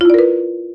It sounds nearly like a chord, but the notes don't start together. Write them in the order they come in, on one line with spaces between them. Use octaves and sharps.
F4 E4 D5 A#4 B4